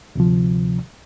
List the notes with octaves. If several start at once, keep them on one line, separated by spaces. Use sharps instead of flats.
D2 C3 F3